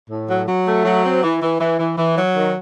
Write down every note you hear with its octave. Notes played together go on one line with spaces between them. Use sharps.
A2
F#3
F#3
A3
F#3
C4
E3
E3
E3
E3
E3
F#3
D#3